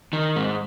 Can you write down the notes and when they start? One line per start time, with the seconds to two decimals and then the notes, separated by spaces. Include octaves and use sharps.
0.13 D#3
0.36 G#2